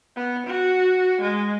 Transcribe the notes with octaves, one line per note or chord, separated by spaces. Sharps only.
B3
F#4
G#3